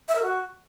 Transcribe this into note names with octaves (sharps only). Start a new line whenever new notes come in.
E5
A#4
F#4